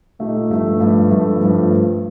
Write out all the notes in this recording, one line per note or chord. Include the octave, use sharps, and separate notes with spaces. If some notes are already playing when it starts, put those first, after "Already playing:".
A#2 A3 D#4 G4
G2 F3 A3
G2 F3 A3
G2 F3 A3
G2 F3 A3